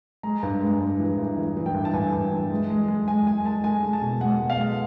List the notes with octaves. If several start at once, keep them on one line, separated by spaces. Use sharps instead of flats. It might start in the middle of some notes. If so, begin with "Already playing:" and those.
G#3 A#5
G2
G#3
G2
E3
G2
E3
E3
G5
G2
A5
G2 G#5
G2
E3
G#3
G#3
G#3
G#3 G#5
G#3 G#5
G#3 A5
G#3 G#5
G#3
A5
B2
G#3 F#5
B2
F5
G#3